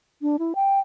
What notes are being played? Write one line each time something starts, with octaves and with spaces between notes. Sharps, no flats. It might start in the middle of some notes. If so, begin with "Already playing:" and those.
D4
E4
G5